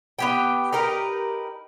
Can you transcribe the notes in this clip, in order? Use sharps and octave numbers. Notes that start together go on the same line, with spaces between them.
B3 G4 G5
D#4 G4 A#4 B4